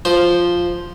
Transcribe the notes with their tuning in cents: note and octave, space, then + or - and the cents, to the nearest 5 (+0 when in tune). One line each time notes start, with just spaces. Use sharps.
F3 +0 C5 +0